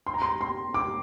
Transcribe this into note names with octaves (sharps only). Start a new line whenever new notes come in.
C6
A#5
C6
C6
D6